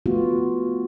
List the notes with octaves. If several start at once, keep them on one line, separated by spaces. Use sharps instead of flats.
A3 B3 F4 F#4